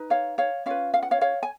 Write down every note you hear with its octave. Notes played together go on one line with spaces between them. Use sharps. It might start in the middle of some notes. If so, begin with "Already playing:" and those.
Already playing: D#4 B4
C#5 F5
C#5 F5
C#4 F4 B4 C#5 F5
F5
F#5
C#5 F5
C#5 F5
G#5